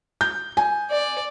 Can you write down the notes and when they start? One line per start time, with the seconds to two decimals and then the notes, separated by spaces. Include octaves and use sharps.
0.21 G6
0.57 G#5
0.90 D5